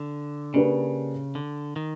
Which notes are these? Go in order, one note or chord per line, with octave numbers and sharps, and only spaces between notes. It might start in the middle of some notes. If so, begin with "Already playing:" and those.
Already playing: D3
C#3 A#3 D4 G4 B4
D3
D#3